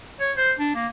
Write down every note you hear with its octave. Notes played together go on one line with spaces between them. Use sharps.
C#5
C5
D4
A#3